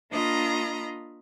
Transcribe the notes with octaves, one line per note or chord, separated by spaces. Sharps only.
A#3 D4 F4 D#5 A#5 B5